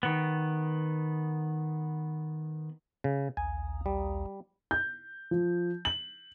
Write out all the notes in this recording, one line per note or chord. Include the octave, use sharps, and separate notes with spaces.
D#3 B3
C#3
A#1 D#2 G#5
G3
G6
F3
F#7